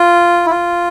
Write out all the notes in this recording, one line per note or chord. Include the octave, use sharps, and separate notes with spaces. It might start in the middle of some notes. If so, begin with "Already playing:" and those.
Already playing: F4
E4
F4